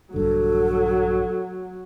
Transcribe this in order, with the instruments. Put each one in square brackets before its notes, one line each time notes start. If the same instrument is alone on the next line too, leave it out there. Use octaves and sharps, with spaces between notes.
[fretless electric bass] A#1 G2 D3 [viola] F#3 [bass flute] A4